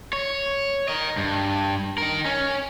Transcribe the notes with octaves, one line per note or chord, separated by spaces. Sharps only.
C#5
A#4 D#5
G2
D#4 A#4
C#4